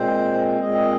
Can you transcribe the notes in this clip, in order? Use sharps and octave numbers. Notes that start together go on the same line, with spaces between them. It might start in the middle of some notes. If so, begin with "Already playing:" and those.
Already playing: A#2 G#3 C4 C5
A#2 G#3 C4 D#5